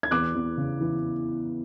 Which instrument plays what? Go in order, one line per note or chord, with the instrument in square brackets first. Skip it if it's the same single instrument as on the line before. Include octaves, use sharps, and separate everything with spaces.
[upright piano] G#6
E2 D6 F#6
E2
C#3
E3